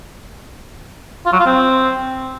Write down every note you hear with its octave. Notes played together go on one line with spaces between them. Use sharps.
F4
F#3
F4
C4